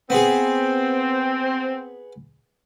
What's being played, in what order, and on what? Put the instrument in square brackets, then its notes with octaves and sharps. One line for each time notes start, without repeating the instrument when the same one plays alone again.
[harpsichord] B3 G#4 [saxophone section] C4